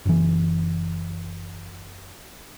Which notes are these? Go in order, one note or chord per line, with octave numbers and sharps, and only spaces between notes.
F#1 E3